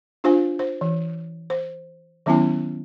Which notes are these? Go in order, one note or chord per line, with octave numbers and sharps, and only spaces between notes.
D4 F4 C5 F5 G#5
C5
E3
C5
D#3 F#3 B3 C#4 E4 G#5